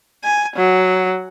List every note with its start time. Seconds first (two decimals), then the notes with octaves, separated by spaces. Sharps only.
0.24 G#5
0.56 F#3